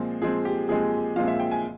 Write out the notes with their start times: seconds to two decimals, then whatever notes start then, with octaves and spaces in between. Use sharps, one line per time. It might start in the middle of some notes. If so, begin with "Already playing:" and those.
Already playing: A#2 F3 G#3 C4
0.21 A#2 F3 G#3 C4 G#4
0.45 G4
0.69 A#2 F3 G#3 C4 G#4
1.16 A#2 F3 G#3 C4 F5
1.28 E5
1.39 G5
1.51 G#5